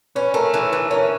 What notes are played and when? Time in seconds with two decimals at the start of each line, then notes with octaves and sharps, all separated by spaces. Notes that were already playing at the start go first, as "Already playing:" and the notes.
0.15 C#4 B4
0.34 A3 A#4
0.53 E3 B4
0.73 E3
0.91 C#4 A#4